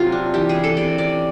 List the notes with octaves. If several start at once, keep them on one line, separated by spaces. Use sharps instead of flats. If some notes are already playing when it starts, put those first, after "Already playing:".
Already playing: C3 F#3 F4
D4
E3 G4
G#4
E3
A4
C3 D5
C#4 D5